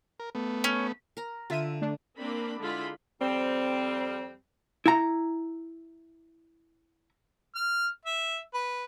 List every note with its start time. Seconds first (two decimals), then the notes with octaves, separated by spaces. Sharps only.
0.20 A#4
0.35 A3 B3
0.64 C#4
1.17 A#4 A#5
1.50 D3 F4 E5 D#7
1.82 A3 D4
2.18 A#3 C4 D4 B5
2.60 D3 G#3 E4 F4 B5
3.21 F2 G3 C4
4.86 E4 A#5
7.55 F6
8.05 E5
8.54 B4